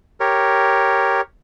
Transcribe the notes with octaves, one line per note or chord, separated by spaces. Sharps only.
G4 A#4 C#5